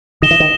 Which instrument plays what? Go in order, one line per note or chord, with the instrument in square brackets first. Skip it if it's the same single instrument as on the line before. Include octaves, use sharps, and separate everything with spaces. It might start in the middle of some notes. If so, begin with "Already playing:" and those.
[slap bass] D#3 [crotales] D#6 A#6 E7 G7
[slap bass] E3
D#3